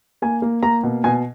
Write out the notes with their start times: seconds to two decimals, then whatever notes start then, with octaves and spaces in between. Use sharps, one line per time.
0.22 A#3 G#5
0.42 A#3
0.63 A#3 A#5
0.83 B2
1.04 B2 G#5